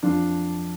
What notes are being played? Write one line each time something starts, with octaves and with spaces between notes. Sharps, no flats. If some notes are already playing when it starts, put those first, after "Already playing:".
F2 D4 F4